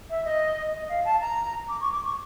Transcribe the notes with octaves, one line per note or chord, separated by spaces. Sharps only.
E5
D#5
D#5
F5
A5
A#5
D6
C#6
D6
C#6